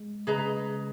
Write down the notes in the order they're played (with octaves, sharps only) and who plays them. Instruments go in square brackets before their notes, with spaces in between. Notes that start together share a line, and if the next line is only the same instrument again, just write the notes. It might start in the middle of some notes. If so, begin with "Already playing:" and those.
Already playing: [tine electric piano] G#3
[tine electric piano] C#3 [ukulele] G#4 B4 D#5 A#5